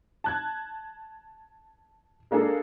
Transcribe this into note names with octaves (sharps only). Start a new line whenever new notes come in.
A5 F#6 G#6
G#3 A#3 D4 G#4 A4